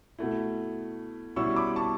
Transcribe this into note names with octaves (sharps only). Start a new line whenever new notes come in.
B2 A3 E4
B2 G3 C#4 E4 C#6 E6
B5 D6
A5 C#6